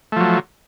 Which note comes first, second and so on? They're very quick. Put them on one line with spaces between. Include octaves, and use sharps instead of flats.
A3 F3 F#3